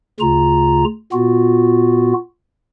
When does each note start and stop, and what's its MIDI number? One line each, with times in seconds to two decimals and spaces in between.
0.20 0.84 38
0.20 0.84 49
0.20 0.84 65
0.20 0.84 82
1.12 2.13 46
1.12 2.13 59
1.12 2.13 65
1.12 2.13 66